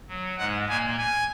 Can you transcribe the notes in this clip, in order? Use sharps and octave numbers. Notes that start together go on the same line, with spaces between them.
F#3
G#2 G#3 F#5
A#2 A#3 G#5
G#5